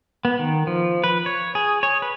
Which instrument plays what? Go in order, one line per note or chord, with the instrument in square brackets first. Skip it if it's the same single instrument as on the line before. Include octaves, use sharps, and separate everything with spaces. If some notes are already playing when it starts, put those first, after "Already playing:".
[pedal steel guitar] B3
D#3
F3
B4
C#5
G#4
C#5
B4